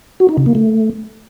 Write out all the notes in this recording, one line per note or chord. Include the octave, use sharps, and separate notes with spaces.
F#4
D#4
C#3
A#3
A3